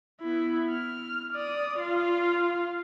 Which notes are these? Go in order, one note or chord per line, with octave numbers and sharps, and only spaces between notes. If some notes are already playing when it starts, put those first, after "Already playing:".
B3 E4
F6
D5 D#6
F4 F5